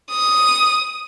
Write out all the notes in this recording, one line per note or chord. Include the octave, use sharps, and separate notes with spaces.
D#6